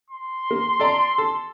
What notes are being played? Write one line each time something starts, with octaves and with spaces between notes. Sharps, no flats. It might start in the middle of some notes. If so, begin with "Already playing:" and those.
C6
A#3
A4 D5 A#5
A4